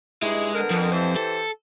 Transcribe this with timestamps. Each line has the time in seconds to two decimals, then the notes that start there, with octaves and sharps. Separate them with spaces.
0.23 G2 G#3 D#4 E4
0.55 D3 B3 A#4
0.70 F2
0.92 E3 G4 C5
1.16 A4